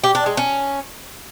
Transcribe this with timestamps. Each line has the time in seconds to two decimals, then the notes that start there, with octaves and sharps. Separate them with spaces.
0.04 G4
0.15 D4
0.26 G#3
0.37 C#4